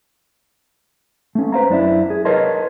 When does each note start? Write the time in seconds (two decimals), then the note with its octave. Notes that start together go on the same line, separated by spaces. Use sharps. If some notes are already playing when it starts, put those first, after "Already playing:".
1.35 A3 C#4
1.52 B4 C5 F5 A#5
1.69 F#2 D4 E4
2.10 G#4
2.25 A#4 B4 C#5 D#5 A5 C6